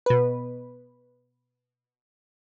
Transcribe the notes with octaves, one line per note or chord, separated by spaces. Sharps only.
B2 B4